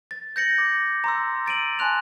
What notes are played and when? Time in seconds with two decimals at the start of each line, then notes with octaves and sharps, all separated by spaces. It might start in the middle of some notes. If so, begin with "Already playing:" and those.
0.11 A6
0.36 G6 A#6 C#7 F#7
0.58 D6
1.04 A#5 C6 E6
1.46 A6 D7 D#7 F#7
1.79 G#5 A5 C6 F#6 F7